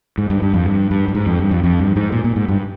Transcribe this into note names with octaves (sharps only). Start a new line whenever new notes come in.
G#2
G2
G2
F2
G2
G2
G2
G#2
F2
G2
F2
F2
G2
G#2
A#2
A#2
G#2
G2